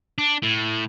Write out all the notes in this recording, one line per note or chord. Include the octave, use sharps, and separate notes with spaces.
D4
A2